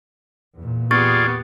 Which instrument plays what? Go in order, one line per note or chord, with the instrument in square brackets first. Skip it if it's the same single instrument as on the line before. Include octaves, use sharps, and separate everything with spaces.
[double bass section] E2 A#2
[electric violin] B3 G4 [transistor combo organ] F4 G#4 D5 [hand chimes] C#6 A6